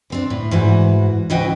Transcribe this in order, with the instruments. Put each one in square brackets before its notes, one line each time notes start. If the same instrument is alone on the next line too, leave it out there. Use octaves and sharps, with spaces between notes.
[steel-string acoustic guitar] D2 C4 D4
A2
G#2 E3 F#4
D2 C#3 E3 F#4 D#5 G5